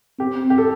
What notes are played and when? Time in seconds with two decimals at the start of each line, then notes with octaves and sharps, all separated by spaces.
0.19 C4 G4
0.50 G4
0.58 A4